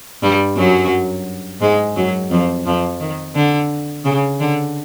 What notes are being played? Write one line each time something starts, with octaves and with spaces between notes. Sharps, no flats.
G2 G3
F#2 F#3
G#2 G#3
F#2 F#3
F2 F3
F2 F3
D#3
D3
C#3
D3